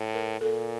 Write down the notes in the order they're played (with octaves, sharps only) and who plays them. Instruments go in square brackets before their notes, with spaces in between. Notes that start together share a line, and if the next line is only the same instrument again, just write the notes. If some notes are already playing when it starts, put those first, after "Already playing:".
Already playing: [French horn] A2
[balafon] A#4
[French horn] A#2 [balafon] A4